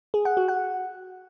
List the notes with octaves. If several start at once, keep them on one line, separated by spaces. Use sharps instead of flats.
G#4
F#5
F#4
F#5